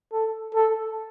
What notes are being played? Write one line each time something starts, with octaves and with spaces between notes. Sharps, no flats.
A4
A4